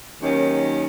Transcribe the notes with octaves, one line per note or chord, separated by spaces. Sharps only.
D#2 D#3 F#3 C#4